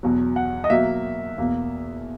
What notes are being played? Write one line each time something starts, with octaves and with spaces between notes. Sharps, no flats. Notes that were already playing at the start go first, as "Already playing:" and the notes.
E2 B2 F#3
F#5
D#5
B2 F#3 A#3 E5
E2 B2 A#3